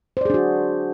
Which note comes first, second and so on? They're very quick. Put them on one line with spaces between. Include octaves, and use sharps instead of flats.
C5 D5 G#4 D4 F#4